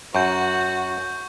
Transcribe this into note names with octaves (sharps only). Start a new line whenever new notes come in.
F#2 F#4 C#6 G6